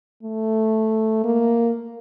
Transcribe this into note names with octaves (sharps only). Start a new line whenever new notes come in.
A3
A#3